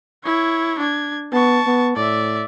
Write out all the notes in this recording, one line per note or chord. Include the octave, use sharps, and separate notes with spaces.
E4 C#5
D4 G#6
B3 A5 C#6
B3
A2 D5 E5